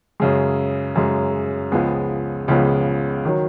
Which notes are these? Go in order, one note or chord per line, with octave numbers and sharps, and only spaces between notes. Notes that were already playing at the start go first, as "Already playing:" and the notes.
F#2 C#3 G#3
F#2 C#3 G#3
C#2 C#3 F3 G#3 B3
C#2 C#3 F3 G#3 B3
D#3 F#3